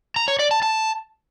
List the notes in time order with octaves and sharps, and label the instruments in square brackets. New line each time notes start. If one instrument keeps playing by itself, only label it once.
[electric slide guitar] A#5
C#5
D5
A5
A5